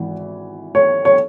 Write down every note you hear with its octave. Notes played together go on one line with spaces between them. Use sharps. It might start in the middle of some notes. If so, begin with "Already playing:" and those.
Already playing: G#1 E3
C#5
C#5